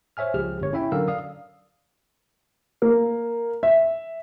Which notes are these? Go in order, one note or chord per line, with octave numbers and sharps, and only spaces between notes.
C5 C#5 E5 G#5 F6
C#2 F3 G4 G#4 F6
G1 C#5
C#4 E4 E5 G5
D3 F#3 A#4 F5 E6
D5 F5 D#6
A#3
E5